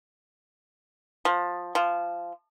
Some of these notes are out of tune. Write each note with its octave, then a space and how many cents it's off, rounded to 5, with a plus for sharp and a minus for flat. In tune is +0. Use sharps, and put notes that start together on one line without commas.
F3 +15
F3 -10